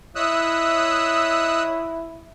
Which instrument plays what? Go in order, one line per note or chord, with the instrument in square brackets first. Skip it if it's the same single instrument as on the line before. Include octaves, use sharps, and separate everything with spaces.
[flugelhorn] E4 [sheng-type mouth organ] C#5 D#5 E5 [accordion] D#6 E6 F#6